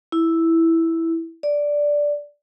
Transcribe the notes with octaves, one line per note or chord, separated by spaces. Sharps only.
E4
D5